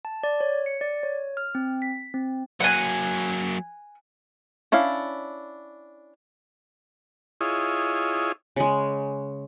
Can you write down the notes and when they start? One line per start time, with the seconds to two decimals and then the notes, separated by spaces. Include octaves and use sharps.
0.05 A5
0.23 D5
0.41 C#5
0.66 C#7
0.81 D5
1.03 C#5
1.37 F6
1.55 C4
1.82 B6
2.14 C4
2.60 F#3 A#3 F#5 G#5
4.72 C#4 D4 E4 F5
7.41 E4 F4 G#4 C#5 D#5
8.56 C#3 G#3